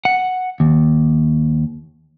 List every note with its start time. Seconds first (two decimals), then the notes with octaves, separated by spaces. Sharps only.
0.05 F#5
0.60 D#2